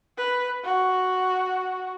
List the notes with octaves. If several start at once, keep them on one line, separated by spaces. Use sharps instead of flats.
B4
F#4